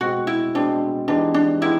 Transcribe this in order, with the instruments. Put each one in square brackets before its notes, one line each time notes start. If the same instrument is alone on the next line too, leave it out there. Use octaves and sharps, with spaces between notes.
[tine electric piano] B2 G#3 C4 [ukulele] F#4
[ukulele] E4
[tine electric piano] B2 G#3 C4 [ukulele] D4
[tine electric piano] E3 G#3 B3 D#4 G4 [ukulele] D4
[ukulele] D4
[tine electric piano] G#3 B3 D#4 G4 [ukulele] E4